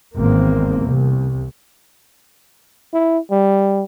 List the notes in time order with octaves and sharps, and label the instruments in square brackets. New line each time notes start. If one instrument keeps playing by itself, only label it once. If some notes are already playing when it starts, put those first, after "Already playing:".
[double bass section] G#1 E2 A#3 C4
C2
[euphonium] E4
G3